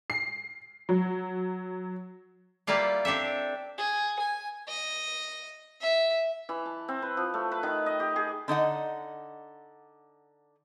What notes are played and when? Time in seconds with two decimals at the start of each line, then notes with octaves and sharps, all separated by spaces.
0.10 C7
0.89 F#3
2.67 G3 A#3 E4 F4 D5
3.05 C4 D4 G4 A4 E5
3.78 G#4
4.19 G#5
4.68 D#5
5.81 E5
6.49 E3
6.66 A5
6.88 C4
7.02 B4
7.17 F3
7.34 A3
7.52 B4
7.63 D#3
7.86 D#5
8.00 G4
8.16 G#4
8.48 D3 D#4 D#5 F#5